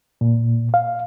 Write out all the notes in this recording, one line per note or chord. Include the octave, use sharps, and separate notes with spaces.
A#2
F5